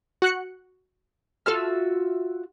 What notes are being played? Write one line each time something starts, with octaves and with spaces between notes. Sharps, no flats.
F#4 F#6 C#7
F4 F#4 A4 E5 F6